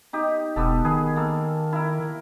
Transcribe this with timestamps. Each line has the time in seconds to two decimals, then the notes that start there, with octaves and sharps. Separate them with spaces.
0.13 D#4 G4
0.56 E1 B3 G4 A4
0.85 D#3 G#4 B4
1.16 A#3 A4
1.72 E4 A#4